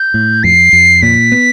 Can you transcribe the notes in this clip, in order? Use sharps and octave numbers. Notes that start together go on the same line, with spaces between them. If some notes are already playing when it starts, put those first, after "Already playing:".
Already playing: G6
A2
F2 C7
F2
A#2 B6
B3